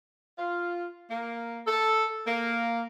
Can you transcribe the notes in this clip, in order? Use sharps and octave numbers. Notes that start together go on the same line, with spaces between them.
F4
A#3
A4
A#3